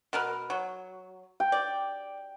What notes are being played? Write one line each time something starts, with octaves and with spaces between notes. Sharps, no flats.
B2 A#4 B4
F#3
G5
D5